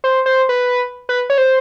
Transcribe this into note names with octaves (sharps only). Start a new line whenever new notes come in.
C5
C5
B4
B4
C#5
C5